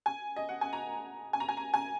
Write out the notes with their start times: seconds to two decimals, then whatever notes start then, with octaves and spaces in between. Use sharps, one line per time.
0.06 G#5
0.36 D#5
0.49 F#5
0.61 G#5
0.73 A#5
1.33 G#5
1.40 A#5
1.49 G#5
1.57 A#5
1.74 G#5